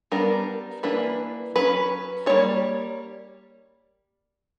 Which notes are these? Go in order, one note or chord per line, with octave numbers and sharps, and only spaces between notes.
G3 B3 D4 A#4
E3 A#3 D4 B4
F#3 C#4 B4
G3 A#3 D4 C#5